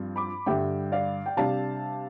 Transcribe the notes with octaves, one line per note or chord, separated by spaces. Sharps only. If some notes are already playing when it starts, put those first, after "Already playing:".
Already playing: G2 F3 C4 F4
B5 D6
G2 D3 G3 E5 G5
D5 F5
G5
C3 G3 D4 F5 A5